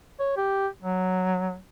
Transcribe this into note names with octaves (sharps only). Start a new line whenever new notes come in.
C#5
G4
F#3